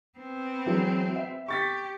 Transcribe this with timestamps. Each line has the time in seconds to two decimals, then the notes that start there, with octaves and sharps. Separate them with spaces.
0.19 B3 C4
0.66 E3 F#3 G#3
1.16 E5
1.48 G4 C#6 A6 B6